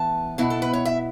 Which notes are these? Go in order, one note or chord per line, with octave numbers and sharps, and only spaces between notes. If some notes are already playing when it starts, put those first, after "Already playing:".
Already playing: A2 E3 B3 A5
B2 B3 E4
A4
B4
C#5
E5